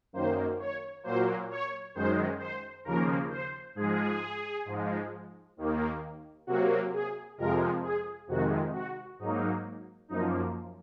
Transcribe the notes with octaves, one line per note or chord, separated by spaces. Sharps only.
F#2 D#3 A#3 C5
C#5
A#2 F#3 A#3 C5
C#5
F#2 D#3 G#3 C5
C5
D#2 C#3 F3 A#3 A#4
C5
G#2 F3 G#3 G#4
G#2 F3 G#3
D#2 D#3 A#3
C3 F#3 A#3 F#4
G#4
F2 C3 F3 G#3 A#4
G#4
F2 C3 D#3 G#3 F#4
F#4
G#2 F#3 A#3 D#4
F#2 F3 A#3 D#4